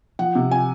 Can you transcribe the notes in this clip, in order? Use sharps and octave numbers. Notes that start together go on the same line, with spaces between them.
F3 F#5
C3
G#5